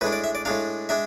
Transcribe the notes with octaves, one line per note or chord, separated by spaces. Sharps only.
A2 G#3 D4 B4
D5
E5
D5
A2 G#3 D4 F5
G#3 D4 E5